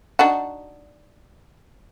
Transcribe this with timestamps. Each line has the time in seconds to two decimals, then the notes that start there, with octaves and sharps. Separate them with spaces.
0.19 D4 D#4 F#4